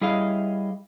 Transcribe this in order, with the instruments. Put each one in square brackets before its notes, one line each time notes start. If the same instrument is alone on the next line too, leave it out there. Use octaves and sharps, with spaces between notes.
[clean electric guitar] G3 E4 G#4 C#5 D#5 F5